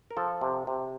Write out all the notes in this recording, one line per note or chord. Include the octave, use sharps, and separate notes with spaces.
A#4
F3 A4
C3
C3